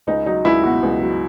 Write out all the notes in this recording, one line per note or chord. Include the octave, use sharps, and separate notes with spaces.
C#2 D#4
F#3 D#4
C#2 E4
B2 F#4
C#2
F#3